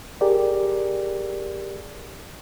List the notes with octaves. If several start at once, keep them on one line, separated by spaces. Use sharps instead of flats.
G4 G#4 A#4 D5